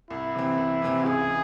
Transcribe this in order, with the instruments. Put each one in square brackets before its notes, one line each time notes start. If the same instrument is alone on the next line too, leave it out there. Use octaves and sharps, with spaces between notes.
[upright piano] C2 [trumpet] E4
[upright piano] C3 E3 C4
C2
C3 E3 C4
[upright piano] C#2 [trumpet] G#4